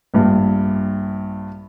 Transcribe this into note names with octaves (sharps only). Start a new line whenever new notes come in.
A#1 G2